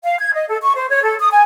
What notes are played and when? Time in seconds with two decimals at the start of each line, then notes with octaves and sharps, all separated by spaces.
0.04 F5
0.18 G#6
0.33 D#5
0.49 A4
0.61 C#6
0.76 C5
0.90 C#5
1.02 A4
1.20 D#6
1.31 G#5